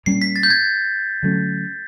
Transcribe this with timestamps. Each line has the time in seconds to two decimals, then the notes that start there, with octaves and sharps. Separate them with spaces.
0.06 A#2 G3 A#3 C#4 C7
0.22 B6
0.36 A6
0.43 G6
0.50 G#6
1.23 D3 F#3 A3 C#4